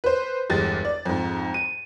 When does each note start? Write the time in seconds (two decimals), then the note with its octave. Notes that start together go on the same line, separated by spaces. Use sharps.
0.04 B4 C5
0.50 G1 E2 G#3 G4 A6
0.85 D5
1.05 F2 G#2
1.54 D#7